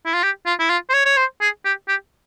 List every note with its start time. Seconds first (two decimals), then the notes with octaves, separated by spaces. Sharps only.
0.06 E4
0.14 F4
0.23 G4
0.46 F4
0.59 E4
0.70 F4
0.90 C5
0.94 C#5
1.06 C#5
1.17 C5
1.41 G#4
1.65 G4
1.88 G4